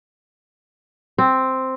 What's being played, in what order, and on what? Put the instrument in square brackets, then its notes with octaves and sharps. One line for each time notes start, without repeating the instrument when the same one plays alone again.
[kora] C4